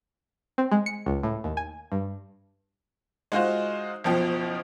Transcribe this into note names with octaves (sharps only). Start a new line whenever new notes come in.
C4
G#3
C#7
C#2
A2
D#2
G#5
G2
G#3 D#4 F4 F#4 C5 F5
F#1 B2 F3 G5